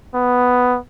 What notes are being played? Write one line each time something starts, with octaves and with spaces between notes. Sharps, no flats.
B3